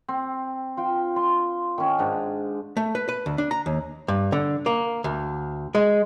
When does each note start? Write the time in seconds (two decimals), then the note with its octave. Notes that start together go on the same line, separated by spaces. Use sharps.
0.08 C4
0.77 F4 G5
1.16 C6
1.78 D#3 C#4
1.98 G#2 D4
2.77 A3
2.95 B4
3.09 B4
3.26 D2
3.38 D4
3.51 A#5
3.66 D#2
4.08 G2
4.32 D3
4.66 A#3
5.04 D2
5.75 G#3